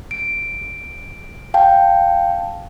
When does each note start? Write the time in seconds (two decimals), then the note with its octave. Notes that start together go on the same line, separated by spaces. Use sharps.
0.11 D7
1.54 F5 G5 A5